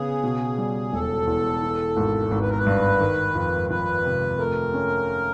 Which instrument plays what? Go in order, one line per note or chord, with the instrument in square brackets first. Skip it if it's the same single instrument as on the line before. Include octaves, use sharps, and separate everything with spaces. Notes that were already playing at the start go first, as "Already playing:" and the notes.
Already playing: [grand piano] C#3 B3 [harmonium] G#4
[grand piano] B2
G3
[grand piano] E1 [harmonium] A4
[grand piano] E2
E3
G#1
G#1
[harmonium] B4
A#4
B4
[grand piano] G2
D#3
F2
[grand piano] F2 [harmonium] B4
[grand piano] C3
[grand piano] A3 [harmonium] A#4
[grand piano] C#4